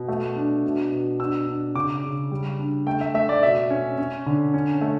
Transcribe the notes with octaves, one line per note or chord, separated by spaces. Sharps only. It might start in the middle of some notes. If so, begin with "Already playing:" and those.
Already playing: B2
A3
D4
B2
B2
D4 E6
D4
C#3 D6
C#3
G3
D4
A3 G5
E5
A3 E5
D5
B2 E5
C#4
C#4
D3
C#4
A3